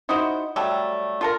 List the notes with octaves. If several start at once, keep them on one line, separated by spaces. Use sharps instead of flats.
D#4 E4 F#4 C5
F#3 G3 A3 A4
F4 A4 A#4